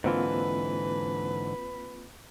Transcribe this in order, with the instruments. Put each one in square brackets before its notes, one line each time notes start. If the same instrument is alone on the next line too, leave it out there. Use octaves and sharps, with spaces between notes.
[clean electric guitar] G#2 D3 E3 [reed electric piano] A#3 C4 F4 [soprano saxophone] B4